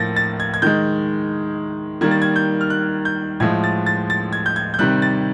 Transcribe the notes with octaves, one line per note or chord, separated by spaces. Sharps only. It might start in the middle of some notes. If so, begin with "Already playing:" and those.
Already playing: A2 F3 A#3 A6 A#6
A6
G#6
G#6
D#3 G#3 G6
D#3 G3 A#3 G#6
A6
G#6
G6
F6
F#6
G6
A2 F3 G#3 G#6
A6
A6
A6
G#6
G6
G#6
G6
C3 D#3 G3 F#6
A6